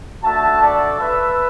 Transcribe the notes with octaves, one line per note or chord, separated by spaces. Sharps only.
A3 D4 F#4 E5 A5
A4 D5
B4 E5